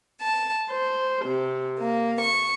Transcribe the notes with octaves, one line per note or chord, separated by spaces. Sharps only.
A5
C5
C3
A#3
C#6